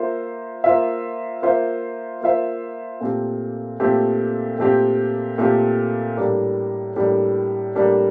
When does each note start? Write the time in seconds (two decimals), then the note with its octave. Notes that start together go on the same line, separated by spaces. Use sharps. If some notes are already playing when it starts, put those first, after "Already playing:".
Already playing: A#3 F4 C5 E5
0.64 A#3 F4 C5 E5
1.42 A#3 F4 C5 E5
2.21 A#3 F4 C5 E5
3.01 A#2 A3 C4 G4
3.80 A#2 A3 C4 G4
4.59 A#2 A3 C4 G4
5.38 A#2 A3 C4 G4
6.17 A2 G3 A#3 D4
6.96 A2 G3 A#3 D4
7.75 A2 G3 A#3 D4